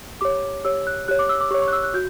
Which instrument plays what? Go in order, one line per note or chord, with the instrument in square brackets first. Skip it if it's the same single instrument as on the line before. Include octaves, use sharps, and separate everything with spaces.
[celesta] G4 C#5 D6
G4 C#5 E6
F#6
G4 C#5 F#6
D6
E6
D6
G4 C#6
C#5
C#6
F#6
E6
F#6
F#4 G6